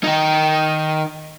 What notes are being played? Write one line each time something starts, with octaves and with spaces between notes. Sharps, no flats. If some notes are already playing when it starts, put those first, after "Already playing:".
D#3 D#4